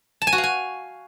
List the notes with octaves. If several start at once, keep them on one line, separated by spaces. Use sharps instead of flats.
A5
G#5
F#4
F5
G#5